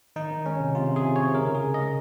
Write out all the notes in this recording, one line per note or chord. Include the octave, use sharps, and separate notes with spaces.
D#3 D#4
D#3
G#3 C#4
C3
C3 F4
C3
G#4
C3
C3 C#5
C#3 A#4
C#3
G#4
C#3
D#5
G#3